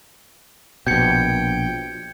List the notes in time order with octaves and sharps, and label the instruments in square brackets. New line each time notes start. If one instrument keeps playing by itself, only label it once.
[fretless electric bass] A#1 B2 [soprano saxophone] G5 [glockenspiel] G6 G#6 C#7